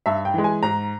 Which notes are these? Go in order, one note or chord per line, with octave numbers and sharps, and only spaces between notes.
G2 E5
G5
E3 G#3
G#5
G#2 A#5